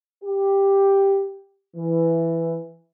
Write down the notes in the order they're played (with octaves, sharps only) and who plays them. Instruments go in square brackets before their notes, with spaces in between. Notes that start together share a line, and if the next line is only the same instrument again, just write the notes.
[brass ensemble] G4
E3